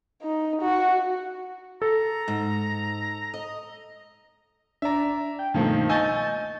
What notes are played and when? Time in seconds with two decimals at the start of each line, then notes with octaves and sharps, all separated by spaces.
0.23 D#4
0.61 F#4
1.82 A4 A#5
2.28 G#2
3.34 D#5
4.82 D4 D5 E5 A#5
5.39 G5
5.54 G2 B2 D#3 F3 A3 A#3
5.89 D#5 G#5 C#6 E6 G6 A6